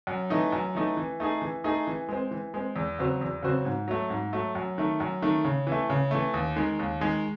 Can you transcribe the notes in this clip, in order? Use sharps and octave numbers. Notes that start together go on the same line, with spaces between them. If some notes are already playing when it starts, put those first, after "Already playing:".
F#2
E3 A3 D#4
F#2
E3 A3 D#4
E3
A3 D#4 G#4
E3
A3 D#4 G#4
E3
G#3 C4
E3
G#3 C4
E2
C#3 F#3 C4 F#4
E2
C#3 F#3 C4 F#4
G#2
F#3 A3
G#2
F#3 A3
F#2
D#3 A3
F#2
D#3 A3
C#3
E3 A3
C#3
E3 A3
D#2
D#3 G#3
D#2
D#3 G#3